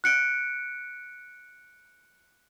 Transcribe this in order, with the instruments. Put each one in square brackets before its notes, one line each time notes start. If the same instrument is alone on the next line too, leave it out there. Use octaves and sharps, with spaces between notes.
[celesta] F#6 C#7 D7